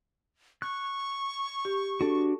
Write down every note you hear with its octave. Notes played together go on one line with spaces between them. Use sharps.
C#6 F#6
G4
D4 F#4 A4